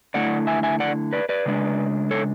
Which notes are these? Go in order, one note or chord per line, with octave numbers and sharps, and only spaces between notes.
D3 A3 C#4 E4 D5 F#5
E5 G#5
E5 G#5
D5 F#5
B4 D5
B4 D5
C#3 G#3 D4
A4 C#5